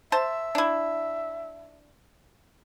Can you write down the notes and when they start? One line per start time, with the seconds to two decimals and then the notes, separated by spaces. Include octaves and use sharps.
0.12 C5 E5 A5
0.55 D4 E4